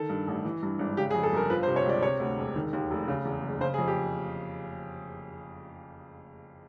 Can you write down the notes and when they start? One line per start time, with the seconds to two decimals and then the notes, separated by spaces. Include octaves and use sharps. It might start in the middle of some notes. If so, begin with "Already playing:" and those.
Already playing: D#3 A4
0.09 G2
0.28 A1
0.45 E3
0.63 G2
0.79 G#1
0.97 C#3 G4
1.11 G#4
1.14 F2
1.23 A4
1.32 G1 A#4
1.50 F3 B4
1.63 C5
1.67 C3
1.76 C#5
1.86 C#2 D5
2.02 C3 C#5
2.20 D2
2.38 E1
2.55 D#3
2.73 D#2
2.91 F1
3.08 C#3
3.25 E2
3.42 F#1
3.61 C#3 C5
3.74 G#4
3.78 F2
3.87 G4